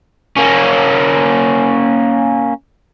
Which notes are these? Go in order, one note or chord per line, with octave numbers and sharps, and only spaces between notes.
A#3 C#4